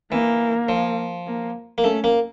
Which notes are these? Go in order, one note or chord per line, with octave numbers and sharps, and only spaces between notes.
E3 A#3
F3
A#3
A#3
A3 C#4
A#3